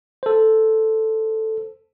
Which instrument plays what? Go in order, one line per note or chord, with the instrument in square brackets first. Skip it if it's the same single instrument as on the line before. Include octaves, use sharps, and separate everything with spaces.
[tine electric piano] A4 C5